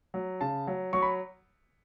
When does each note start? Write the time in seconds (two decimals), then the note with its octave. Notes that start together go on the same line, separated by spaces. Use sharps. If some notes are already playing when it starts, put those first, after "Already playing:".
0.14 F#3
0.41 C#3 A5
0.67 F#3
0.93 F#3 C#6
1.02 B5